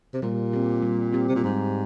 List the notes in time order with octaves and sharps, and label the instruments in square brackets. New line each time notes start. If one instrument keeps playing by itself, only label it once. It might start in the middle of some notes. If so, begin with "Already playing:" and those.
[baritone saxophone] C3
[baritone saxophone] A#2 [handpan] G3
[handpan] C4 G4
G3
C4 G4
[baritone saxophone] C3
A#2
[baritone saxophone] G#2 [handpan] G3